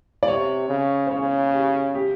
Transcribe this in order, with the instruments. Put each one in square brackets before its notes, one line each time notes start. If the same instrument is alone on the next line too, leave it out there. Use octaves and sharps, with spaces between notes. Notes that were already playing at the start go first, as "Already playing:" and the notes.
[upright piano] D5
[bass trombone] C3 [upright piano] C#5
[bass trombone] C#3
[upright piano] C5
[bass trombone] C#3 [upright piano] C#5
[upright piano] G4
G4